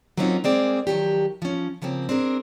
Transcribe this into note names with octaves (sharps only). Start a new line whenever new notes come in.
F#3 A#3 C4 C#4 D#4 F4
G#3 A#3 C4 G#4 D5
D#3 F3 F#3 G4
F3 C#4
C#3 F3 A#3 C4
C4 D4 G#4 A#4